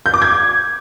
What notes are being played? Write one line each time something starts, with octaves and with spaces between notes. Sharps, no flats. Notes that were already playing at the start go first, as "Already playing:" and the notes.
G6
D6
G#6